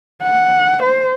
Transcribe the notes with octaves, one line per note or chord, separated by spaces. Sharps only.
F#5
C5